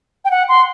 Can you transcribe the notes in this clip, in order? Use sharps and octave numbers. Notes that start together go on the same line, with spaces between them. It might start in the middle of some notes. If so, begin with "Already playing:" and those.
G5
F#5
C6